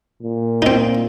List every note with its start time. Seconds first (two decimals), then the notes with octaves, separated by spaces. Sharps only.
0.22 A#2
0.62 C4 D#4